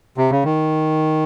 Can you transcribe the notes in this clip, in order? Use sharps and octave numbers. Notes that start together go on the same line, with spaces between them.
C3
C#3
D#3